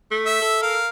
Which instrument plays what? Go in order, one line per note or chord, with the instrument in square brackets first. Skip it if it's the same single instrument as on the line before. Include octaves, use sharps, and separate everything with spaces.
[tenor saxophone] A3
[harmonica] E5
[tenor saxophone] A4
[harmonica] A#4 F5